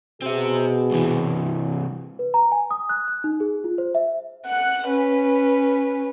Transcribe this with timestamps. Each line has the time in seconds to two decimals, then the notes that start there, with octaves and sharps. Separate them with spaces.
0.22 B2 C4 G#4 E5
0.91 C2 E3
2.19 B4
2.34 A#5
2.52 G#5
2.71 D#6
2.89 F#6
3.08 F#6
3.24 D#4
3.40 G#4
3.64 F4
3.78 C5
3.95 E5
4.47 F#5 F#6
4.89 C#4 B4